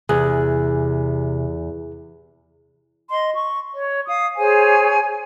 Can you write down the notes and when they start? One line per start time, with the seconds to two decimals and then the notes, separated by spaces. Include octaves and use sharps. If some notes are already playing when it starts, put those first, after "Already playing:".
0.09 E2 C3 G#4 F#6
3.10 D#5 C6
3.34 C#6
3.74 C#5
4.07 F5 D#6
4.37 G#4 C5 C#5 G#5